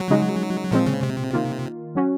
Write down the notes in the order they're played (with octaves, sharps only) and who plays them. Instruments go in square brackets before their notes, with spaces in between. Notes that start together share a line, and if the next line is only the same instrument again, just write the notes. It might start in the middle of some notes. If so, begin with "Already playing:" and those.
Already playing: [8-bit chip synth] F#3
[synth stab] C#3 G#3 D#4 F#4
[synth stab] A#2 G#3 C4 [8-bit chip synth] F3
[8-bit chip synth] C#3
C3
[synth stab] D#3 A#3 F4
F#3 C#4 F#4